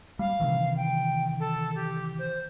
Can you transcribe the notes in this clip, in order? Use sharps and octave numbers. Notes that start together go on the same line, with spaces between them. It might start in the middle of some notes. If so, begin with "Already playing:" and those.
G3 F5
C3 D#3 E3
G5
A4
G4
C5